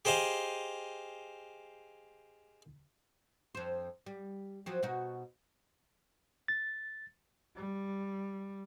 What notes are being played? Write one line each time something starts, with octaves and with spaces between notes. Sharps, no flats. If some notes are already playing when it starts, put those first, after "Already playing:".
G4 G#4 C5 D#5 F5
F2 C5
G3
F3 F#3 C4
B2 D#4 F#4
A6
G3